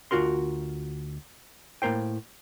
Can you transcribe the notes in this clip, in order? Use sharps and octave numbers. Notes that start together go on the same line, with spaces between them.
D2 D#3 F4 F#4 A#4 C6
A2 A#3 A#4 C5 G5